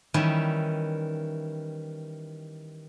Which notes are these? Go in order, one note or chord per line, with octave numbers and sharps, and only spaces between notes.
D#3 E3 G3 C#4 E4